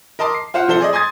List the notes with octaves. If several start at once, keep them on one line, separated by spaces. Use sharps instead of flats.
A#4 D#5 A5 C6 D6
C7
F4 C5 F5 F#5
C2 F3 A4 C5 G7
G#4 D5 D#5
G#5 C6 D#6 G#6 A6